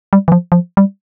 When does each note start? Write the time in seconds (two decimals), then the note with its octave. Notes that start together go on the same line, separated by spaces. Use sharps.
0.13 G3
0.28 E3
0.32 F3
0.52 F3
0.77 G3